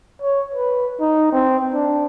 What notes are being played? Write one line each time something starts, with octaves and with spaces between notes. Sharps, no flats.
C#5
B4
D#4
C4
D4